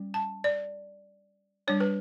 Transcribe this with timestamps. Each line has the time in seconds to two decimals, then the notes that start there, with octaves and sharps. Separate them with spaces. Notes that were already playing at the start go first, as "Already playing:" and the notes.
Already playing: G3 C#4
0.14 A5
0.44 D5
1.67 G3 D4 C#5
1.80 B4